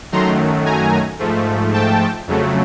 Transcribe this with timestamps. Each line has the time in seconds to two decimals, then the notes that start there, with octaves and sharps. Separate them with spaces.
0.12 F#2 D#3 F#3 A3 A#5 C6
0.65 G#5 A#5
1.19 G#2 F3 A3
1.73 G5 A5
2.27 F2 C#3 F#3 A3